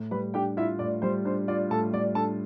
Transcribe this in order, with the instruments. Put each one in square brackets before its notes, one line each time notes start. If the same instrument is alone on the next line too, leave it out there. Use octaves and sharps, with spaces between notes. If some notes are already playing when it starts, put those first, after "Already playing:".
Already playing: [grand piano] A2
[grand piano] G3 [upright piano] B4 B5
[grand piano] D4 [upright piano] G4 G5
[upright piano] E4 E5 [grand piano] F4
[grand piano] A2 [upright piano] D5
[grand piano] G3 [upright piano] C5
[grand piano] D4 [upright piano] C5
[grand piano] F4 [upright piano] D5
[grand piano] A2 [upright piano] A4 A5
[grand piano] G3 [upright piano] D5
[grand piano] D4 [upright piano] A4 A5